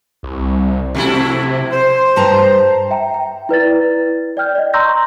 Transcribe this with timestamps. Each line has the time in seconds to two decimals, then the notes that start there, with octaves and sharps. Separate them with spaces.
0.23 C2
0.95 F2 C3 A3 E4
1.72 C5
2.16 G2 A5 A#5
2.91 E5 G5 A#5
3.14 G5
3.49 E4 B4 D5 A6
4.37 D5 G5 F6 G6
4.55 D5 D#5
4.73 A#5 C6 C#6 E6 G6 A#6